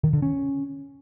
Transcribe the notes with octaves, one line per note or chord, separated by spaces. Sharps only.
D#3
D3
C#4